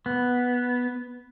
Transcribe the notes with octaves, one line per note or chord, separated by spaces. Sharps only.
B3